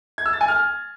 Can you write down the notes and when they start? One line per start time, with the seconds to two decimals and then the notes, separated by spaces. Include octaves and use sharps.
0.18 G#6
0.26 E6
0.33 A6
0.41 G#5
0.48 F6